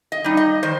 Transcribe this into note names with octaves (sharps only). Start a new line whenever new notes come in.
D#5
G3 D#4
D#5
D#3 C5